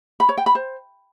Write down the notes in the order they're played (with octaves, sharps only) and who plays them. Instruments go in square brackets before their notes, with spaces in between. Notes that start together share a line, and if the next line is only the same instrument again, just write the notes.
[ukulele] B5
C#5
G5
B5
C5